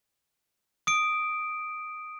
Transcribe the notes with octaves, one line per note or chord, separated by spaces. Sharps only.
D#6 D7